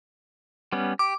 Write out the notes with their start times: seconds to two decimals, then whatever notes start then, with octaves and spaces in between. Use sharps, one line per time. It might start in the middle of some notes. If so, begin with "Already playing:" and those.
0.72 G3 B3 C#4
0.99 G4 D6